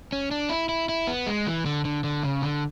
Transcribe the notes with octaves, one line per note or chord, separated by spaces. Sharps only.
C#4
D4
E4
E4
E4
B3
G#3
E3
D3
D3
D3
C#3
D3